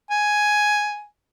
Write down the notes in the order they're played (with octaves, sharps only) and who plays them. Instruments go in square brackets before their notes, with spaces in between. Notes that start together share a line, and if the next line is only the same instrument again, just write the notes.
[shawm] G#5